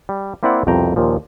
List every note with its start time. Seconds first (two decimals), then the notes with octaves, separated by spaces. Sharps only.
0.09 G3
0.43 A#3 C4 E4 C5 D5 F#5
0.67 C2 F2 B2 G5 A#5
0.96 D#2 A#2 F3